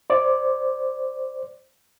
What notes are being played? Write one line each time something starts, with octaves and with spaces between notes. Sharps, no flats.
C5 D5